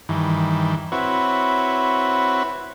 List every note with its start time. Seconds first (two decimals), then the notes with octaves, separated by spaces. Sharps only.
0.09 G2 D#3 E3
0.92 C4 E4 F#4 B4 C#5